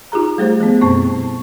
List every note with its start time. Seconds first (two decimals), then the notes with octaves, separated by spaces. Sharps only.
0.12 D#4 F4 G4 G#4 A#5
0.38 G3 A3 G#4 C5
0.60 F3 B3
0.81 F#2 B2 C4 C5 A5 C#6